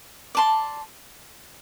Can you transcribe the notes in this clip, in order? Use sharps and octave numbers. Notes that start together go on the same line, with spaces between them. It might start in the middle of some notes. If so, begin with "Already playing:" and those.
D5 A5 C6